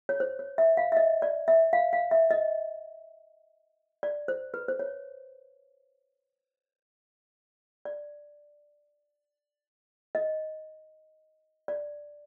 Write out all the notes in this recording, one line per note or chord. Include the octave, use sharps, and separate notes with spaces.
C#5
C5
C#5
E5
F5
E5
D#5
D5
E5
F5
F5
E5
D#5
D5
C5
B4
C5
C#5
D5
D#5
D5